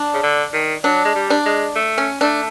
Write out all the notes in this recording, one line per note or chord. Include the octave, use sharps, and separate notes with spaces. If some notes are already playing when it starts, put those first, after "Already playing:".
Already playing: D4
C#3
D3
D#3
F#3 D4
G#3
G3
D4
G#3
A3
C#4
A3 D4